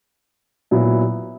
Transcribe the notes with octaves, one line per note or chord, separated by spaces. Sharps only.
A#2 F#3 B3 E4